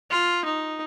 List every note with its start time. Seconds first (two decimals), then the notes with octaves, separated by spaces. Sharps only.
0.11 F4
0.45 D#4